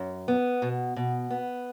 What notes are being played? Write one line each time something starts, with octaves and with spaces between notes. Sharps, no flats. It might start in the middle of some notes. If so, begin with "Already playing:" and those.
Already playing: F#2
B3
B2
B2
B3